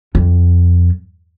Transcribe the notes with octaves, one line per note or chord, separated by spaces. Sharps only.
F2